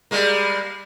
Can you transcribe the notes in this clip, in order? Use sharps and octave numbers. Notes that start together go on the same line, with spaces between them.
G3 G#3 A#3